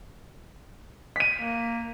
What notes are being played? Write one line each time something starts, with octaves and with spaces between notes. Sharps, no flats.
B6 D#7
A#3